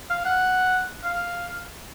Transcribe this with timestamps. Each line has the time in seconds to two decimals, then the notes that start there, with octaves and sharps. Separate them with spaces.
0.10 F5
0.25 F#5
1.04 F5